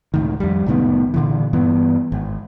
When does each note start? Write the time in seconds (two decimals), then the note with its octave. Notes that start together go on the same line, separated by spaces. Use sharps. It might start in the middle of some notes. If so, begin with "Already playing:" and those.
0.14 C#2 A2 D#3
0.40 F2 G3
0.66 C2 A2 D#3 B3
1.14 A#2 D3 E3
1.53 G2 E3 B3
2.12 G#1